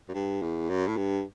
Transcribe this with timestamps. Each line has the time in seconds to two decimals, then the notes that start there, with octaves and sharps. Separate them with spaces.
0.09 F#2
0.14 G2
0.42 E2
0.70 F#2
0.88 A2
0.97 G2